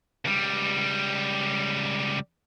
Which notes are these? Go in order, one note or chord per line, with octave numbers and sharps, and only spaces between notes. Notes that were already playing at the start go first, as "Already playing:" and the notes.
C#2 G3